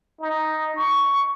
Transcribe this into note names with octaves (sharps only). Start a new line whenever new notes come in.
D#4
C#6